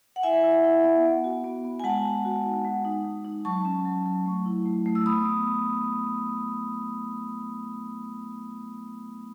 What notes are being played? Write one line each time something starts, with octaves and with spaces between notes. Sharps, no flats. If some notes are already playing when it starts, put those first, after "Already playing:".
F#5
E4 E5 G#5
E4
E4
B3
B3
F#4
B3
B3
G#5
G#3 F#5 A5
G#3
F#4
D#4
G#3
D#4
G#3
D#4
F#3 A5 C#6
C#4
F#3
F#3
A3
E4
A3
A3
E6
B3 B5 D#6
B3